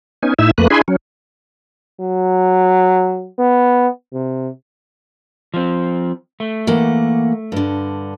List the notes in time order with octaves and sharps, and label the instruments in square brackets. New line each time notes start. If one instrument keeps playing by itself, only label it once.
[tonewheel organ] B3 C#4 D#4 G#5
A2 D#4 E4 E5 E6
F2 A3 A#3 B4 F#6
D4 E4 G#4 G#5 B5 C6
F#3 C#4
[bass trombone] F#3
B3
C3
[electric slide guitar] F3 C4
A3
[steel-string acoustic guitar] E3 A#3 F#5
G2 D3